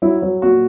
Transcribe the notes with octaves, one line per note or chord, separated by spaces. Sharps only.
F#3 E4
F#3
A#2 F#4